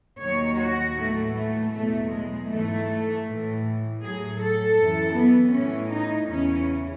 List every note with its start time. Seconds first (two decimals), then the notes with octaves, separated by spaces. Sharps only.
0.20 D#2 D#3 F#3 C#5
0.59 F#4
0.97 A2 E3 A3
1.35 A3
1.72 E2 B2 F#3 A3
2.11 G#3
2.49 G#2 E3 A3
3.24 A2 E3
4.01 A2 F#3 G#4
4.39 A4
4.77 F#2 E3
5.15 B3
5.52 A2 E3 C#4
5.91 D#4
6.29 E2 C#3 E3 C#4